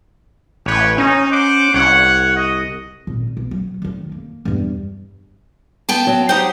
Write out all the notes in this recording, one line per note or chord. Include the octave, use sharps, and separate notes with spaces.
A1 G4 B4 C#5
C#4 D#4
C5 F#5 D6
C2 C#5 F#5
D#5
G#1 A#2
B1
F#3
F1 D#3
A#3
E2 G2
B3 G5 A5
F#3
D#4 G4 C5 F#5